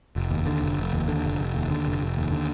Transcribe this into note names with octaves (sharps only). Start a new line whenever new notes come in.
F1
D#2
D3
F1
F1
D#2
D3
F1
F1
D#2
D3
F1
F1
D#2
D3